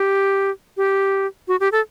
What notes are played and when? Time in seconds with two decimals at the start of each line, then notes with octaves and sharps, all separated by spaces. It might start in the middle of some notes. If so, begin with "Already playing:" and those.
Already playing: G4
0.77 G4
1.48 F#4
1.60 G4
1.72 A4